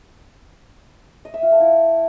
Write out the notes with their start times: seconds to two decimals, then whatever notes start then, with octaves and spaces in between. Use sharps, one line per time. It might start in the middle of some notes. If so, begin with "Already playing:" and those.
1.25 D#5
1.34 E5
1.43 F4
1.51 A4
1.60 E4